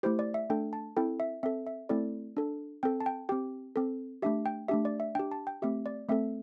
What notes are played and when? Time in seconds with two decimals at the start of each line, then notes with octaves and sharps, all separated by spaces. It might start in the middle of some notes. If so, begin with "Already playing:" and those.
0.03 A3 E4 G4 C5
0.19 D5
0.34 E5
0.50 A3 D4 A4 G5
0.73 A5
0.97 C4 E4 A4 G5
1.20 E5
1.43 C4 A4 E5
1.67 E5
1.89 A3 C4 E4 A4 D5
2.37 D4 A4
2.83 C4 A4 G5
3.01 A5
3.06 G5
3.29 C4 G4 G5
3.76 C4 A4
4.22 A3 D4 G4 E5
4.46 G5
4.68 A3 D4 G4 E5
4.85 D5
5.00 E5
5.15 D4 G4 G5
5.32 A5
5.47 G5
5.62 A3 C4 G4 E5
5.86 D5
6.09 A3 C4 A4 E5